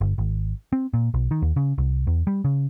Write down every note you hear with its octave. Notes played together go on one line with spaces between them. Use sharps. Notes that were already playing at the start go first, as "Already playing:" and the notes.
G1
G#1
C4
A#2
B1
D#3
D#2
C#3
C2
E2
G3
C#3